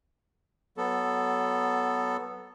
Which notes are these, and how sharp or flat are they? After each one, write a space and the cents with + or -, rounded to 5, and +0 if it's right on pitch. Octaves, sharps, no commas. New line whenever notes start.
F#3 +20 B3 +0 A4 +0